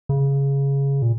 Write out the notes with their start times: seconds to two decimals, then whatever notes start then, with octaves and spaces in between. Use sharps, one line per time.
0.09 C#3
1.02 A#2